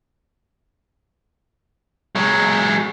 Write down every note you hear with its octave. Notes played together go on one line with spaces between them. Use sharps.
F#3 G#3